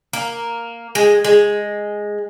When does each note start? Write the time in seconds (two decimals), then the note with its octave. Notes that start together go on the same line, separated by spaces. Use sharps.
0.13 A#3
0.95 G#3
1.25 G#3